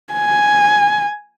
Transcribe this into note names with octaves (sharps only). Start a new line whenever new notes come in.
G#5